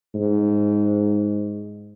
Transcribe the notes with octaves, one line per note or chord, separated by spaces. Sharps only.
G#2